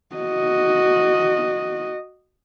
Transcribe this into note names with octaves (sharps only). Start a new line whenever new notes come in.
F#4 D#5